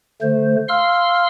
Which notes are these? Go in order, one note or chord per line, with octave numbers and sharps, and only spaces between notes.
D3 A3 C5
F5 C6 E6 F6